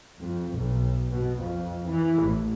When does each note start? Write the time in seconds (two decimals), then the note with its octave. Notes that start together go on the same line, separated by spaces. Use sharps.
0.19 F2
0.52 B1
1.12 B2
1.40 F2
1.88 E3
2.22 A1